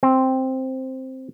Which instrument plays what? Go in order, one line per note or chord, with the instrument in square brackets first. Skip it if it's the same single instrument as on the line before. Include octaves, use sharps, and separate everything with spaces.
[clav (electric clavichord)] C4